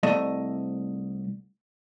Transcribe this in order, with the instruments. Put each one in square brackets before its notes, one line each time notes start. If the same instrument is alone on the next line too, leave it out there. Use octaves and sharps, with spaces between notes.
[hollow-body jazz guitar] C2 A3 D#5 E5